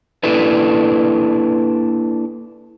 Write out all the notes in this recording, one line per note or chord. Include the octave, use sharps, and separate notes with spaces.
A#3 D4 E4 A4 B4